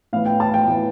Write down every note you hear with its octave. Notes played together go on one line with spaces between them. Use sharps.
A2 E3 B3 F5
G5
A5
G5
A2 E3 B3